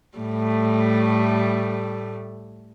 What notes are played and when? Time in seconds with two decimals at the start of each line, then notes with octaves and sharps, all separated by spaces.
0.18 A2 G3 A3